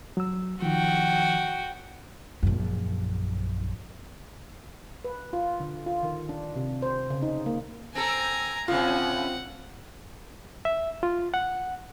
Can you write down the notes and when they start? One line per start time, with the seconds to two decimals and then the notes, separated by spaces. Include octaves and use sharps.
0.17 F#3 E6
0.62 D#3 F3 F#4 G5
2.43 A#1 F#2
5.05 B4
5.33 F4
5.60 D3
5.86 F4
6.03 D#3
6.29 D4
6.56 C3
6.82 C5
7.10 C#3
7.22 D#4
7.46 A#3
7.95 C4 A4 G#5 A#5
8.68 A2 C#3 C4 F4 F#5
10.65 E5
11.03 F4
11.34 F#5